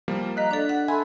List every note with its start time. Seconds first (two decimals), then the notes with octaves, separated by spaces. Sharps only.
0.08 F3 G3 A#3
0.37 D#5 F5 A#5 F#6 B6
0.51 D4 A4 D5
0.69 F#5
0.88 A4 E5 G#5 B5 C6